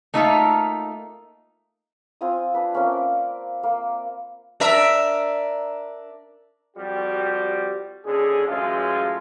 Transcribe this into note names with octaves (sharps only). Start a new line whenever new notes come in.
A3 A#3 D#4 F4 A4 E5
C4 F4 G#5 D#6
D4 B4
A#3 C4 C#4 E5
D5
A#3
D4 A#4 E5
F2 G3 F#4 G4
D#2 D3 C#4 G#4
A1 F#2 A2 G#3 F4 A4